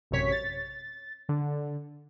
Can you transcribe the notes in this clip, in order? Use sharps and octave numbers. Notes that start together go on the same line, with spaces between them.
A1 F#2 C3 C#5 B6
A6
D3